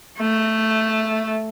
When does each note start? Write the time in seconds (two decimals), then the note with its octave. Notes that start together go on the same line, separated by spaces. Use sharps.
0.19 A3